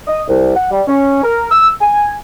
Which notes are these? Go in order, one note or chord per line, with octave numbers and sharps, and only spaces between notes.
D#5
C2
F#5
G3
C#4
A#4
E6
G#5